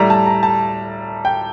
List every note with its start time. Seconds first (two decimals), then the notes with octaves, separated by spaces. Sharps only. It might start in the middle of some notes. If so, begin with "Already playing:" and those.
Already playing: A2 G3 A#5
0.10 A5
0.26 A#5
0.43 A5
1.25 G5